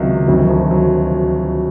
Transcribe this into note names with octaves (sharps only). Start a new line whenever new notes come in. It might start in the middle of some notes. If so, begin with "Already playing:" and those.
Already playing: C#2 C3 D#3 F#3
D2 C3 D#3 F#3
F#3
F3
F#3